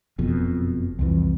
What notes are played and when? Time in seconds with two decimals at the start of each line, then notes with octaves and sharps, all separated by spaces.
0.18 F#1 F2 B2
0.99 C2 F2 E3